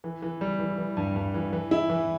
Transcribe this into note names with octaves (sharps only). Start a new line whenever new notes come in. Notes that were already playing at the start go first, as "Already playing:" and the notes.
E3
E3
G3
E3
E3
G2
G2
E3
E3
E4
E3